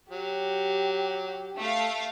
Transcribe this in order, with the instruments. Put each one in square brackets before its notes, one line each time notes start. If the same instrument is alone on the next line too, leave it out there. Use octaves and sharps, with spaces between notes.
[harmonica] F#3 [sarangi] G4
[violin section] A3 F5